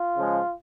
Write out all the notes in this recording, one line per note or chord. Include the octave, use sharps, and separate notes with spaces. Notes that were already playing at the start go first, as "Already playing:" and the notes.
Already playing: F4
C#3 F3 G#3